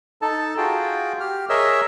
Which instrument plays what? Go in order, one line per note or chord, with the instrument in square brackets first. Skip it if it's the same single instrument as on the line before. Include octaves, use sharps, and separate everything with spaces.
[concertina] D#4 A4 A5
F4 F#4 G#4 G5
G4 F6
G#4 A#4 C#5 D#5 E5 E6